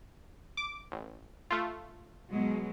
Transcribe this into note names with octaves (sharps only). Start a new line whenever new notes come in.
D6
A1
A3 F4
B2 F#3 G#3